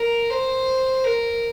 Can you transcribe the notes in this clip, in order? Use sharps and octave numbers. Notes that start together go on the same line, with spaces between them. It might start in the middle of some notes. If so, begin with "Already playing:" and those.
Already playing: A#4
C5
A#4